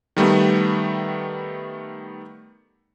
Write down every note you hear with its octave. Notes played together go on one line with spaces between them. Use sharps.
D#3 G3 A3 B3